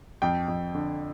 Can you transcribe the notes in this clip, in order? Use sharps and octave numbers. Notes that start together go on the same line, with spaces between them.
F2 G5
F2
D3